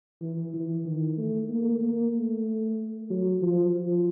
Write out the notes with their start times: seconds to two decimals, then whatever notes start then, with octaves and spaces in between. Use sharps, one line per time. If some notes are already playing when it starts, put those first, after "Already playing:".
0.22 E3
0.54 E3
0.86 D#3
1.18 A3
1.50 A#3
1.82 A#3
2.14 A3
3.10 F#3
3.42 F3
3.74 F3